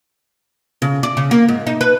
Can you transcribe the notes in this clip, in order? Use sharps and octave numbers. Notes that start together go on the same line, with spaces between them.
C#3
D5
C#3
A#3
G#2
D#4
B4